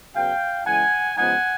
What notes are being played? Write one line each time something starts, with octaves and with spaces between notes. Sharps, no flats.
C#3 F#3 B3 F5 G5
C#3 E3 G#3 F#5 G#5
C#3 F3 G#3 B3 D#4 F#5 G#5